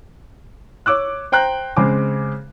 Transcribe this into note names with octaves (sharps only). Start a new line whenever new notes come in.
C#5 D6 E6 F#6
C5 G5 A#5 F#6
C#3 G#3 C4 G#5 D6